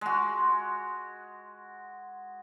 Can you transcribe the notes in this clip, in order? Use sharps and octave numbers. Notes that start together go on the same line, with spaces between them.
G#3 F#4